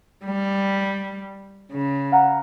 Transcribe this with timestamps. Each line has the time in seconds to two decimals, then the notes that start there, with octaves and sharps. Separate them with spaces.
0.25 G3
1.72 C#3
2.12 F5 F#5 A#5